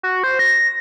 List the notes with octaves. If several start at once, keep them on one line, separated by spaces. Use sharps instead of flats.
F#4
C5
A#6